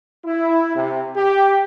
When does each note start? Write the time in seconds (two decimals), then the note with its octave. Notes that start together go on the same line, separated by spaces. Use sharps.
0.25 E4
0.76 C3
1.16 G4